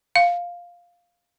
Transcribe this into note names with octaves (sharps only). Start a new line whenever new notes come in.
F5